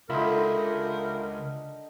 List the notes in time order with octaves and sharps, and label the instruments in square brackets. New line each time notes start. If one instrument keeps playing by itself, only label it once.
[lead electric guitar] C#2 [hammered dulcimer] D3 D#4 [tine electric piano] F4 E5 B5 [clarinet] A#4